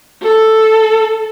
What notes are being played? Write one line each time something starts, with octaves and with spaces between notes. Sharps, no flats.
A4